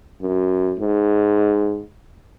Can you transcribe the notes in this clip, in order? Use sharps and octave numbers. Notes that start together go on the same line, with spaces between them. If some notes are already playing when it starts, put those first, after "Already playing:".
F#2
G#2